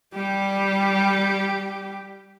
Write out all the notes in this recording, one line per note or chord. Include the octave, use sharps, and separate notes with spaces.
G3 G4